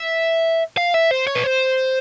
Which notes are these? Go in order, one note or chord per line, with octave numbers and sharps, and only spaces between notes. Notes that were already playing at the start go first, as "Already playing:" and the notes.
Already playing: E5
F5
E5
C5
C#5
B4
C5